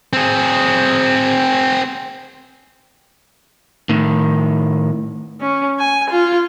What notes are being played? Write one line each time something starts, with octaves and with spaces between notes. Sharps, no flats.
C4 G#4
A2 D#3
C#4
G#5
F4